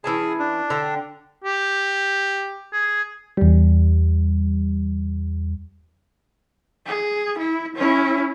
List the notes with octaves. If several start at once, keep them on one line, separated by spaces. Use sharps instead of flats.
E3 C#4 G#4 A5
D4
D3 G5
G4
G#4
E2 G3
G#4
E4
C#4 E4